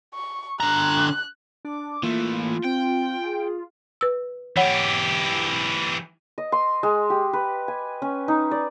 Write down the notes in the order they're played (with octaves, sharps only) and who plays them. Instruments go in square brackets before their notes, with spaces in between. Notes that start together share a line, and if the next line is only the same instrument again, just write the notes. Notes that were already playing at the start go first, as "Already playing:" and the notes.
[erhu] C#6
[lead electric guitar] D3 A#5 [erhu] F#6
[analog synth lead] D4 [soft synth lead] D6
[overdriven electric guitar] E3 A3 [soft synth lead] A#3 [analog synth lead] F4
[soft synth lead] C4 [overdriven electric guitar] G5
[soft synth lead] G#4
[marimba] B4 E6
[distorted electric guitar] E3 G4 [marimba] C#5 F#5
[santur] D#5
C6
G#3
G4
B4
G#5
C#4
D#4
D5